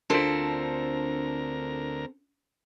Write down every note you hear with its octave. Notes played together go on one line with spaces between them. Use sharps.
D2 C4 D4 F4 A4 A#4 C5